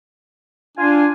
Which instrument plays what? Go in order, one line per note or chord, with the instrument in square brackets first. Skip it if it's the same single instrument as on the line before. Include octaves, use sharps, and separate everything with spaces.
[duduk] D4 [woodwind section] F4 G#5